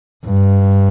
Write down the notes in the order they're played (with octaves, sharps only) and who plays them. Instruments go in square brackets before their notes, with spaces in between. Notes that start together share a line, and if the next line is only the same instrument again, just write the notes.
[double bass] G2